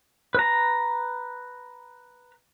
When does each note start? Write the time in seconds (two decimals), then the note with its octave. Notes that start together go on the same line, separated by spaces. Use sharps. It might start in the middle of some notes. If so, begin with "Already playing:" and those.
0.35 B4 A#5